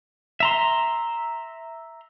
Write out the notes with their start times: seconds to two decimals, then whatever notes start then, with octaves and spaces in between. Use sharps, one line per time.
0.40 E5 A#5 C6